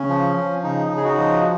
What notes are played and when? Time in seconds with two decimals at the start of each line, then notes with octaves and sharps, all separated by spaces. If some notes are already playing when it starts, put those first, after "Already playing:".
Already playing: C#3 C#4
0.09 F3
0.36 F3
0.63 C#3 D#4
0.91 C#3
0.97 G#4
1.04 D#4 F#4
1.18 F3